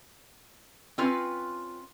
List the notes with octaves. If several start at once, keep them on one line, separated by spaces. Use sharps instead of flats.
C4 C#4 F4 B4